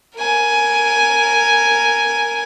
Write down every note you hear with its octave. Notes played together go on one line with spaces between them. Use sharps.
A#4 G#5